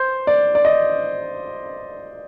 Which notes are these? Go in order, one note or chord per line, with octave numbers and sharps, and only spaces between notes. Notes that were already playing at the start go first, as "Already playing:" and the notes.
Already playing: C5
D5
D5
D#5